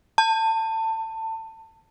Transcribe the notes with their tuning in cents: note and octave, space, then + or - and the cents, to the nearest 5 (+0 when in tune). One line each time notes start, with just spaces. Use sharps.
A5 +25